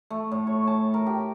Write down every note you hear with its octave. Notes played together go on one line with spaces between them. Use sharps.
A3
A2
C#5
A5
A#4
G4